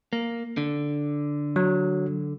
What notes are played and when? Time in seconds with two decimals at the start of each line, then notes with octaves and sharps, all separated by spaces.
0.13 A#3
0.57 D3
1.56 F#3